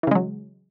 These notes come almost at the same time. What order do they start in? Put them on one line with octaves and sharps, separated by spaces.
E3 C#3 G#3 F#3